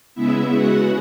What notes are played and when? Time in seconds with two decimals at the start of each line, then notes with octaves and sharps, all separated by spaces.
0.15 C#3 G#3 B3 E4 E5
0.53 F#4 F#5